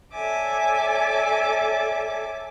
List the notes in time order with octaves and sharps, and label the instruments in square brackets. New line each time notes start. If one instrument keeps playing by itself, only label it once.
[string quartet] A4 C#5 D5 E5 G#5 D6